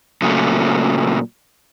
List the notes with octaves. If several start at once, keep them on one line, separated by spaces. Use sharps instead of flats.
A#2 C#3 F#3 A3